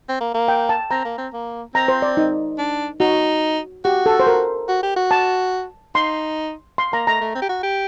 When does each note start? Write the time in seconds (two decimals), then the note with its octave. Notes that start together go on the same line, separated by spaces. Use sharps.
0.09 C4
0.21 A#3
0.34 A#3
0.48 G5
0.69 A5
0.91 C4 A#5
1.05 A#3
1.18 C4
1.33 A#3
1.75 C4 A#5
1.88 C5
2.02 D5
2.17 D#4
2.58 D4
3.00 D#4 F#4
3.84 F#4 G4
4.06 A4
4.20 C5
4.27 A#4
4.69 F#4
4.83 G4
4.96 F#4
5.11 A5
5.95 D#4 C6
6.78 C6
6.93 A#3 A#5
7.07 A3 A#5
7.21 A3
7.35 C4
7.42 G4
7.49 F#4
7.63 G4